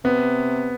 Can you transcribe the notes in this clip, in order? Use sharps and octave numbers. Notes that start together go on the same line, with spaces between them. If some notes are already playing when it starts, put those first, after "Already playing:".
C3 B3